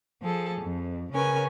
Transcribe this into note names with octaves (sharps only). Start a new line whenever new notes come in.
F3 G#4 A4
F2
C#3 C#4 A#4 B4 G#5